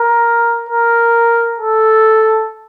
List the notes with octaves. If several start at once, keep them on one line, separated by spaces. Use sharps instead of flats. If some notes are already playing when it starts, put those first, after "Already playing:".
Already playing: A#4
A#4
A4